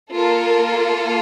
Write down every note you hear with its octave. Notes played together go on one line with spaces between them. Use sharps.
A#3 F4 A4 A#4